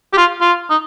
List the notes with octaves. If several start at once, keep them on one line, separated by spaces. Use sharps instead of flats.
G4
F4
F4
D#4